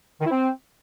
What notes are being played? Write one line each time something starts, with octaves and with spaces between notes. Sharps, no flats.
D#3
E4
C4